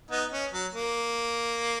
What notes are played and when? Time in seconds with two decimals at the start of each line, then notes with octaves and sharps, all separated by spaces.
0.11 B3 D#4
0.32 C#4
0.52 F#3
0.72 A#3